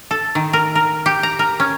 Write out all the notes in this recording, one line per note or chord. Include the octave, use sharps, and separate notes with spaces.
A4
D#3
A#4
A#4
G4
A#5
A#4
C#4